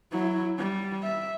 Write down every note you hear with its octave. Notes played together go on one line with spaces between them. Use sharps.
F#3 E4
G3
E5